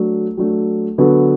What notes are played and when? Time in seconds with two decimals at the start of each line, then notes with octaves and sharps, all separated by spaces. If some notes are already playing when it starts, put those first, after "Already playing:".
Already playing: F#3 A3 D4
0.37 F#3 A3 D4
0.98 D3 F#3 B3 F#4 A4